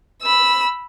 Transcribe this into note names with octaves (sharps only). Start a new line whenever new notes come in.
B5 E6